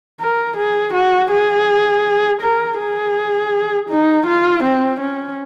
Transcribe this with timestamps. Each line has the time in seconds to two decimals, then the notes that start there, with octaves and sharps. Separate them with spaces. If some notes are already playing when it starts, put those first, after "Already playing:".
0.20 A#4
0.57 G#4
0.94 F#4
1.31 G#4
2.42 A#4
2.79 G#4
3.89 D#4
4.27 F4
4.64 C4
5.00 C#4